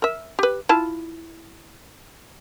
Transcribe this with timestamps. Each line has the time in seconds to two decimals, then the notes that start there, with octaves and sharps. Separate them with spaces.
0.02 A#4 E5
0.39 G4 B4
0.69 E4 F4 A5